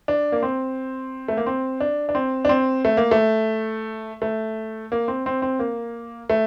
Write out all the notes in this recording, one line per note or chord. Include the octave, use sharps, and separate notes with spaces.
D4
A#3
C4
A3
A#3
C4
D4
D4
C4
D4
C4
A3
A#3
A3
A3
A#3
C4
C4
C4
A#3
A3